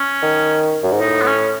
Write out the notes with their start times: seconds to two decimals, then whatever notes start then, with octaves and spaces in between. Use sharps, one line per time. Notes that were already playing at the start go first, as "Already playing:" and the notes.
Already playing: C#4
0.23 D#3
0.83 F#2
0.92 G#2
1.00 A2 D#4
1.22 B3
1.27 C#4